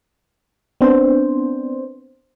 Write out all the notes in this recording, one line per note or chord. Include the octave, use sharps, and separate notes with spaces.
B3 C4 D4 C5